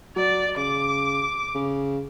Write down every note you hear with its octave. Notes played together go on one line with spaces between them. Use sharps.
F#3 D5
C#3 D6
C#3